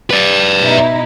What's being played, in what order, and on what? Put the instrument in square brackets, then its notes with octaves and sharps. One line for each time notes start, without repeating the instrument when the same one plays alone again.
[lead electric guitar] B4 D5
[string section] B2 D#4 E4